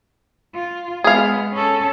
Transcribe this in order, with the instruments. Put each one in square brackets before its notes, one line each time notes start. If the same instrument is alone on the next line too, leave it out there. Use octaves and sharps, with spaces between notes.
[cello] F4
[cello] G#3 B3 [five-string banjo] G#4 F5
[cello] C#4 A4